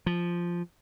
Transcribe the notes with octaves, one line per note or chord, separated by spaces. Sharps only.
F3